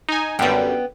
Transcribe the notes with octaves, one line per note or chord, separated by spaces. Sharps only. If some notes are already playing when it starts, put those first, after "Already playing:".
D#4 G#5
F#2 D3 G3 B3 G5